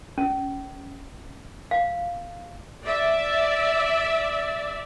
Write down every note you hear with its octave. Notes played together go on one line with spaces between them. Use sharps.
C#4
F5
D5 E5